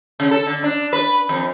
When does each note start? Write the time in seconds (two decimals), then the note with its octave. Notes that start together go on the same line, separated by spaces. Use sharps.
0.20 C#3
0.31 A4
0.47 D3
0.64 D4
0.93 B4
1.29 F2